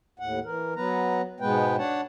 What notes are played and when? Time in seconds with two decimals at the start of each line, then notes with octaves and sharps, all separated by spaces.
0.20 D#2 A2 F#5
0.45 E3 A#4
0.76 F#3 B3 B4 A#5
1.40 G#2 B2 G#3 B3 B4 G5
1.78 D4 C#5 F#5 A5